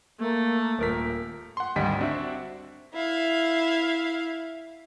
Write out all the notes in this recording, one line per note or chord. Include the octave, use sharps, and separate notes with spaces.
A3 A#3
D#1 A#4 B6
F#5 C6
G#1 D2 G3 D#5 G5 B6
C4 D4 F#4 D5 E5
E4 F5